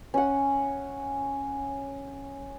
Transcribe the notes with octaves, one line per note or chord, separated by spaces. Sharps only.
C#4 F#5